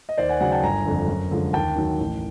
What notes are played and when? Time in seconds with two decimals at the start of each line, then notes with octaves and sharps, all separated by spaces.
0.09 D#5
0.17 D#2 C5 D5
0.29 F#5 G#5
0.40 C#3 F#3 F#5 G#5
0.52 G5 A5
0.63 G1 G#5 A#5
0.85 F2 D3
1.08 F#2
1.31 D3 F3 G#3
1.53 D#2 G5 A5
1.76 D#3 F#3
1.99 A1